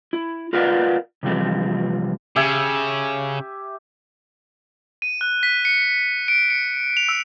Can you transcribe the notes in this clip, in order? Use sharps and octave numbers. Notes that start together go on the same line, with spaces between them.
E4
F4 A#4 B4 D5 F5 F#5
C3 E3 F3 G3 C4
C#3 G4 E5 G#5
D#7
F#6
B6
C#7
C#7
D7
C#7
F7
E6